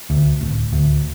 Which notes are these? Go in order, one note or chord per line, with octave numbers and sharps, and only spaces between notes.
D2
D1
D2